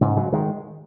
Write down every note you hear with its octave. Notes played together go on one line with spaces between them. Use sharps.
G#2 C#3
C#3 F#3
D#3 G#3